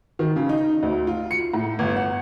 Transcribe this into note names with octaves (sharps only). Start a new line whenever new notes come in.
D#3
C#3
D#4
D2
F4
C#7
A2
G1
F#5